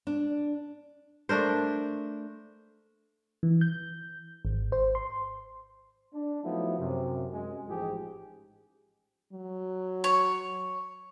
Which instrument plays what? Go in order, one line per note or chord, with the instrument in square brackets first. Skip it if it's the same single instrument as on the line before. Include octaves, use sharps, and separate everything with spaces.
[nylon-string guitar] D4
[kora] A3 D4 A#4 C5
[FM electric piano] E3
G6
G#1
C5
C6
[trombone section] D4
F3 F#3 A3 B3 D#4 E4
F#2 C3
F#2 G#3
A1 G#2 F3 G4 G#4
[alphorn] F#3
[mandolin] C#5